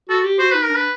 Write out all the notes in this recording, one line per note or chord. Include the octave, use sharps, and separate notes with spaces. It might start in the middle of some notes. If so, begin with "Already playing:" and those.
F#4 A4
G4
F#4 C5
D#4 B4
A#4
D4
B4